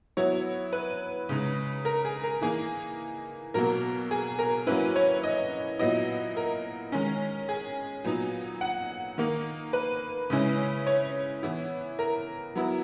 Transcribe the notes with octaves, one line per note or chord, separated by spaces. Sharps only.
F#3 B3 E4 C#5
B4
C#3 G#3 D#4
A#4
G#4
A#4
E3 A#3 D#4 G#4
B2 F#3 A#3 A#4
G#4
A#4
F#3 A#3 C#4 E4 B4
C#5
D#5
A#2 F#3 B3 E4 D#5
A#4
D#3 G#3 C#4
G#4
A#2 F#3 B3 D#4
F#5
D#3 A#3 D#4
B4
C#3 G#3 C#4 E4
C#5
E3 B3 E4
A#4
F#3 B3 E4